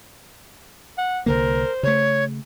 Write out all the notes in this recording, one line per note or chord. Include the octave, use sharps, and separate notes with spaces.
F#5
C2 D3 A#3 A#4 C5
C#3 A3 C#5